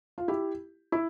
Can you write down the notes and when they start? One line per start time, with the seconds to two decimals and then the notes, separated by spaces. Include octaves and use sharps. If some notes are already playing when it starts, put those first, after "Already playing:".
0.18 F4
0.28 E4 G4
0.92 E4